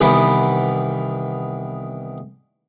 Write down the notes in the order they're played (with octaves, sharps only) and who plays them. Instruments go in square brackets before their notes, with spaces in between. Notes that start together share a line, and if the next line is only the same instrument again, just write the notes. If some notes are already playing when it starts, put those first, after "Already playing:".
[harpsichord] C2 D#3 E3 B3 B4 B5